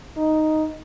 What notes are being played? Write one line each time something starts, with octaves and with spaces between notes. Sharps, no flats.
D#4